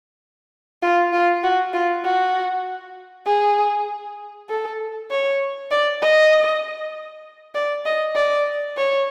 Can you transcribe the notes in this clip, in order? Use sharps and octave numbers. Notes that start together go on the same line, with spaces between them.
F4
F4
F#4
F4
F#4
G#4
A4
C#5
D5
D#5
D5
D#5
D5
C#5